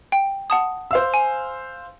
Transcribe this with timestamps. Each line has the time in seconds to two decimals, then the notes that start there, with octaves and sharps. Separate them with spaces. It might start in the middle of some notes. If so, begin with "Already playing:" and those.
0.12 G5
0.50 F#5 A5 D#6
0.91 C5 F5 E6
1.14 G#5